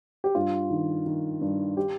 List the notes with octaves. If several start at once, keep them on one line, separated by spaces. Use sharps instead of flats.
G4
G2 F4
D#3
D#3
G2
G4